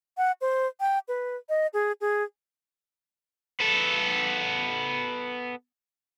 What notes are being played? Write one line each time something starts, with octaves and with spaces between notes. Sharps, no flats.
F#5
C5
G5
B4
D#5
G#4
G#4
B3 A4